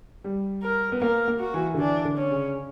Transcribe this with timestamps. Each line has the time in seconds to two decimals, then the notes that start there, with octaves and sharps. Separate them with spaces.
0.24 G3
0.63 A#4
0.92 B3
1.02 A#3 A#4
1.28 A#3
1.40 F#4
1.54 E3
1.74 D3
1.79 E3 D4
2.05 D3
2.18 C#4
2.31 C#3